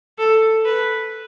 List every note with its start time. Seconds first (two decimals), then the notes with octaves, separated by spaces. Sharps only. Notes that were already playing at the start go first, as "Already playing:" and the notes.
0.18 A4
0.65 B4